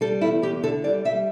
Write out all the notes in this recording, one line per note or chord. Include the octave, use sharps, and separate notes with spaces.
G3 A4
E2 E4
E2 G4
D3 A4
G3 D5
G3 E5